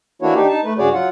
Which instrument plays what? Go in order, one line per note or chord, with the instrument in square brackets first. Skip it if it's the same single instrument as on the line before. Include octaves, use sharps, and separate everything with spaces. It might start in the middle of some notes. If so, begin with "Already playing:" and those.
[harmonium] E3 A#3 D4 E4 F#4 C#5
D4 D#4 G4
D#4 A5
A3 B4
G2 C#3 F#4 G#4 C#5 D5
F#3 F4 F#5